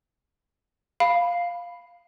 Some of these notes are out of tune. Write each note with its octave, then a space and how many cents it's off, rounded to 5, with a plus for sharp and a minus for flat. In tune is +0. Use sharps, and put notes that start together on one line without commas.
F5 +0 B5 +0